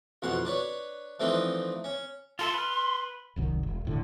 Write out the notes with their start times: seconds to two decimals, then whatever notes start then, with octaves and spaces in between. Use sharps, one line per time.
0.22 A1 F2 B2 F#5 C6
0.45 D4 B4 C#5
1.20 E3 F3 A3 C4 D4 D#4
1.84 C#4
2.39 F4 A4 E5 C6
2.54 B4 F6
3.36 D#1 C2 F#2 D#3
3.63 E1
3.85 D#1 A2 D3